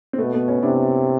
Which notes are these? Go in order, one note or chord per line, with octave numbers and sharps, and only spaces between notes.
C4
B2 A3 B3
A3 B3
B3 C#4
C3 D4 E4